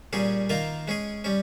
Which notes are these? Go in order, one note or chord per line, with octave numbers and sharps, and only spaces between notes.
A#2 G3 C#4 G#4
D#3 A#3 F4 A#4
G#3 C#4 G#4
G3 C#4